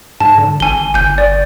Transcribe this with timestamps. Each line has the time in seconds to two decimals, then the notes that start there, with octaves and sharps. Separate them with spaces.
0.20 G#2 A5
0.38 D3
0.60 G#1 G#5 G7
0.94 G1 G#5 G6
1.18 D5